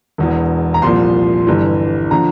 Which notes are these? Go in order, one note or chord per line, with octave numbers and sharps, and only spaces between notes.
E1 E2 E3
A#5
C2 A#2 F3 C6
G1 G2 E3
D3 F3 A#5